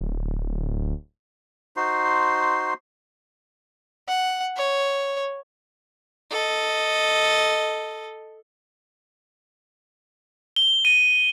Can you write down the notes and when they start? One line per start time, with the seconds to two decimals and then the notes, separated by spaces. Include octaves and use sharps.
0.01 D1
1.77 D#4 F#4 C5 C6
4.08 F#5
4.56 C#5
6.32 A4 D#5
10.56 G7
10.85 D#7